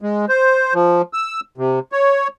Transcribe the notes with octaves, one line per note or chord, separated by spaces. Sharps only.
G#3
C5
F3
E6
C3
C#5